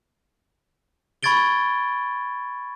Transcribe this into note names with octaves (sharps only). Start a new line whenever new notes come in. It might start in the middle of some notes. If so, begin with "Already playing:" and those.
B5 C#6 G#6 A6 D7 G7